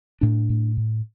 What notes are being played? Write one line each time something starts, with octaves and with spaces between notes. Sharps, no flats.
A2 D4
A2
A2